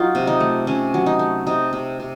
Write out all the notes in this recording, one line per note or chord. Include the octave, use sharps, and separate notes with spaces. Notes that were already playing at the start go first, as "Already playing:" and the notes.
Already playing: F#3 D#4 F4
C3
D#4
A3
C3 C#4
F#3
D#4
A3
C3 D#4
C3
C3